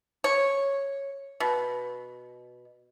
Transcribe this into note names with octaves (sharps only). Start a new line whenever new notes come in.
C#5
B2